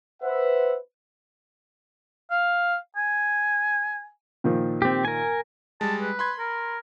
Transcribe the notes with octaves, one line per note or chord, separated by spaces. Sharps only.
B4 C5 E5 F#5
F5
G#5
A#2 D#3 F3
C4 G4
A#4 G#5
G3 G#3 A5
B4
B5 C6 G#6
A#4